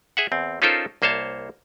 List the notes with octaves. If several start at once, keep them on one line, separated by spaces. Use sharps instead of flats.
G#4 E5 F#5
E2 C4
C#4 D#4 F4 A4 A#4 C5
C2 A#3 C5 C#5 A5